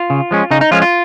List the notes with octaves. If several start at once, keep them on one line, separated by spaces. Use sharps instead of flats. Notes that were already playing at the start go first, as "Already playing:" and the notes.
Already playing: F4
C#3
F3 G#3 C#4
C#3 D#4
D#4
F3 G#3 C#4 F4
F4